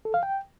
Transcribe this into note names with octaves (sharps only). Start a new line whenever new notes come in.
A4
F5
G5